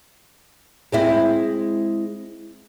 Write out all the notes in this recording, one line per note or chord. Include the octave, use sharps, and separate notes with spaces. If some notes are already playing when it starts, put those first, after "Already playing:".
G#3 C4 E4